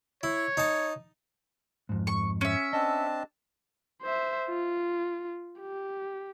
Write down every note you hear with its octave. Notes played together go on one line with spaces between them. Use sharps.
E4 C#5
D#4 A5
F2 G#2
C#6
C#4 E5
C4 D4 D#5 A5
C5 E5
F4
G4